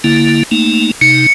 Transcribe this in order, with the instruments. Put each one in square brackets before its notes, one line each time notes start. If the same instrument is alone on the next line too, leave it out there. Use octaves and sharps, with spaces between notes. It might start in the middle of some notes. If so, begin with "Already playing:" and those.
[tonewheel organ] D3 A#3 E4
A3 A#3 D#4
[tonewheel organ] C3 D#4 [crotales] C#7